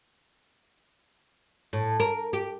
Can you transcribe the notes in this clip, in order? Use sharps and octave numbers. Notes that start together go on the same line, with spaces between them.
A2
A#4
G4